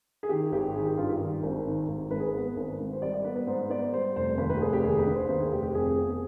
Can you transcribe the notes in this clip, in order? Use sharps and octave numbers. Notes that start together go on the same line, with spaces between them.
G#4
D#3 G4
G#1 G4
D#3 G#4
G4
G2 F4
G4
D#3
G#1
D#3
G#1
G#1 B4
G#4
B4
B3
G#1
G#1
C5
G3 D5
D5
B3 B4
B4
G#2 C5
B3 D5
G3 C5
F1 C5
D#2 B4
B4
G4
F1 G#4
G4
D#2 G#4
B4
D3
C5
D#2 C5
G#4
F1 G4
G4
F2 G#4
B3
G#4